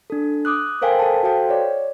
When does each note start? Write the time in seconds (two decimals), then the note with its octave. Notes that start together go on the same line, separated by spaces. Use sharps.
0.10 D4 A4
0.45 D6 D#6 F#6
0.81 A4 A#4 C5 F5 G5 G#5
0.99 A4 A5
1.23 F#4 A4 C5 F5 G5
1.49 C#5 D5